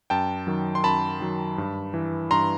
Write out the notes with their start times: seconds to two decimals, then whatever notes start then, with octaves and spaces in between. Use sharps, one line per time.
0.10 F#2 G5 A5
0.47 D#3 F#3
0.75 C6
0.84 F#2 A5 B5
1.20 D#3 F#3
1.58 G2
1.94 E3
2.31 G2 A#5 C6